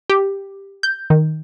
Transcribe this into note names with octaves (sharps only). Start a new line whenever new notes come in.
G4
G6
D#3